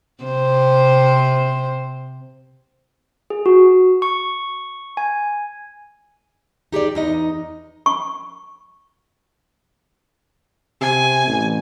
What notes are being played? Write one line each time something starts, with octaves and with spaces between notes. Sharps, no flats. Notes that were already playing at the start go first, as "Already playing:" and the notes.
C3 C5
G#4
F#4
C#6
G#5
D#4 G4 G#4 D5
E2 D#4 D#5
C#6
C3 G#5
A1